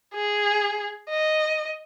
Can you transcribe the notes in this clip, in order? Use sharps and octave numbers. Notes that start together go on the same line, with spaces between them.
G#4
D#5